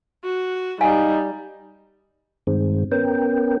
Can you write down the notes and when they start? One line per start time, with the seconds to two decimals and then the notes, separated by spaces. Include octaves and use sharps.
0.24 F#4
0.81 G3 D#4 F5 G#5
2.47 G2 D#3 G#3 C4
2.92 B3 C#4 A#4 G5